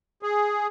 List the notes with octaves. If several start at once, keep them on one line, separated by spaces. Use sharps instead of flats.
G#4